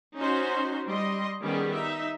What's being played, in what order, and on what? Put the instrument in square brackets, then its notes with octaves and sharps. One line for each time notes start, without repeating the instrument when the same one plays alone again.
[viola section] C#4 D#4 F#4 C5
G3 D#5 C6
D#3 G3 B3 C#4 G4 G#4
D#4 E5